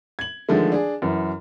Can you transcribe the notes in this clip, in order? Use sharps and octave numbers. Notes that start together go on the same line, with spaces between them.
G#6 F#7
D3 D#3 F3 G#3 A3
D4 G#4
F#2 E3